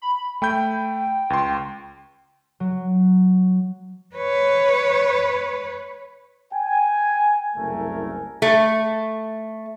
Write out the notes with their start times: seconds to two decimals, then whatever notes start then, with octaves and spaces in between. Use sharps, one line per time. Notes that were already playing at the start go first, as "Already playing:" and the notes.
0.02 B5
0.42 A3 G5 B5 G6
1.30 C#2 C6
2.60 F#3
4.16 B4 C#5
6.53 G5 G#5
7.55 F#1 C2 A3 A#4 G#5
8.42 A3